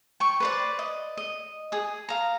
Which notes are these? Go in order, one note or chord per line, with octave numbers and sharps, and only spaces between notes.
G5 C#6
B4 C5 D5
D#5
D#5
G#4 D#6
F5 A#5